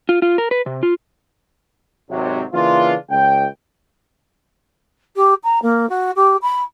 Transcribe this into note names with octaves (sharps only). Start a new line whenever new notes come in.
F4
F4
A#4
B4
C3
F4
G#1 C3 F#3
C#3 E3 A#3 D4 F4
C#2 G5
G4
A#5
A#3
F#4
G4
B5